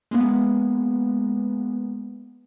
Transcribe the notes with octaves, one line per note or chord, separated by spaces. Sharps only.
G#3 A#3 B3